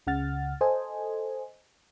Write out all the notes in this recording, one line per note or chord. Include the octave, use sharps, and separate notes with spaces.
C#2 C#3 F#5 F6 A6
A4 C5 D#5 G#5